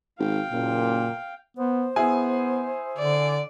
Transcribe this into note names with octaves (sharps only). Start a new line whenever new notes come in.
G#1 F5 G5
F#1 A#2
B3 C5
B3 E4 G#4 G#5
D3 D5